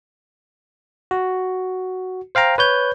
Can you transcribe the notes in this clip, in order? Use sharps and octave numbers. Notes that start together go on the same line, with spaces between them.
F#4
C5 F5 G5 A#5
B4 C#5 G6